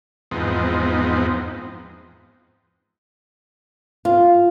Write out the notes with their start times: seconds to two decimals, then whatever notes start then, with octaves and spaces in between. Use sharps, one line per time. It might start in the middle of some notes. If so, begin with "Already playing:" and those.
0.31 E2 G#2 F3 B3 C4 D#4
4.05 F4